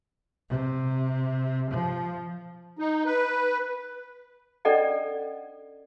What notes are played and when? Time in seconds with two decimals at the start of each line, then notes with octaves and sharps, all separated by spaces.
0.50 C3
1.71 F3
2.79 D#4
3.05 B4
4.65 C#4 D4 A4 D5 D#5 F#5